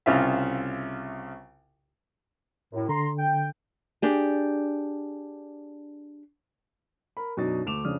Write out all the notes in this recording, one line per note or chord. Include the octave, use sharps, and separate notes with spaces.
C2 C#3 F4 E5
F#2 A2
D3 A#5 C6
G5
D4 G4 G#4
A#4 B5
F#2 B2 D4 D#4 A6
D2 A3 D6 E7 F7
F2 C#3 D4 D#6 F6